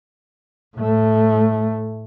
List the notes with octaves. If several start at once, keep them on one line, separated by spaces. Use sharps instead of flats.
A2 A3